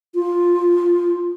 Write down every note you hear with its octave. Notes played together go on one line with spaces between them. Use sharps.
F4